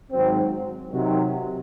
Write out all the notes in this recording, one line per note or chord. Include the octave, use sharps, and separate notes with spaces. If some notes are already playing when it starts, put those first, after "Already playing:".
G#1 G#2 F#3 C4
C3 D#3 F#3